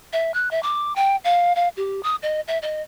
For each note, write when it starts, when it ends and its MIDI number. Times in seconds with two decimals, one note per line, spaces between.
0.13 0.32 76
0.34 0.51 90
0.51 0.62 76
0.63 0.95 86
0.96 1.16 79
1.24 1.55 77
1.55 1.68 77
1.77 2.03 67
2.03 2.16 87
2.22 2.41 75
2.48 2.58 76
2.62 2.82 75